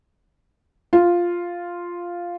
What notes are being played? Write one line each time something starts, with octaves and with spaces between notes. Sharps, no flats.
F4